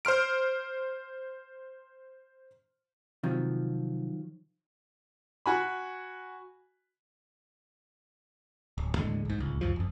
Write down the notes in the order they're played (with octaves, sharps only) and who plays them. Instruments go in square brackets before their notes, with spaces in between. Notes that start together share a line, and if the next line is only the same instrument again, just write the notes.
[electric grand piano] C5 C6 F6 D7
[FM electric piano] C3 [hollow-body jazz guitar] D#3 F3 F#3
[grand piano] F#4 G#5 B5
[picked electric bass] D1
D#2 A2 D3 G#3
A#1 G#2
D1 C#2
C#2 F#2 F3
G1 F2